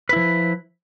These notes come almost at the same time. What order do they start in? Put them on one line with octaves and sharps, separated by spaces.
B4 E4 F3